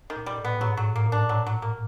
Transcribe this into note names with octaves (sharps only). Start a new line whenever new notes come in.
D#3
A#2
G3
A2
B3
G#2 F#3
F#3
A2
A#3
A#2
D4
F#3
F#3
A#3